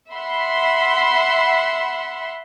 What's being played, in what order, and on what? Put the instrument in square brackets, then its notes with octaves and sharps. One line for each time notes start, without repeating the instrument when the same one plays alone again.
[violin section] E5 F#5 B5 C6